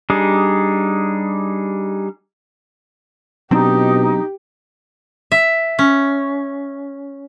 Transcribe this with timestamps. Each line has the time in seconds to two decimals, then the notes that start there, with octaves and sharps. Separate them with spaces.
0.10 G3 D4 D#4 G#4
3.51 B2 F#3 C4 D4 D#4 G4
5.32 E5
5.79 C#4